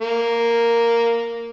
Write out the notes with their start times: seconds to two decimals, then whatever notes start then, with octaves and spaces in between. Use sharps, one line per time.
0.02 A#3